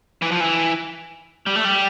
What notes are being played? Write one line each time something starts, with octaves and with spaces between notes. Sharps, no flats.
E3
F3
E3
G3
A3
G3